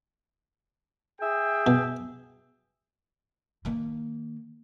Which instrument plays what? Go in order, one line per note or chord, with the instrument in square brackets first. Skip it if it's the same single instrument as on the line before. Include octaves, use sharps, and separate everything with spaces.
[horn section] G#4 E5 G5
[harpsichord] B2
[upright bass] D#3 A#3